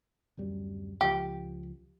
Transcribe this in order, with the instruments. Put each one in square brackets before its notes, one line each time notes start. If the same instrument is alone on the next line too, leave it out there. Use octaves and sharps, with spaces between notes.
[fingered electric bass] D1 F#2 G3
[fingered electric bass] C#2 F3 [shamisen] G4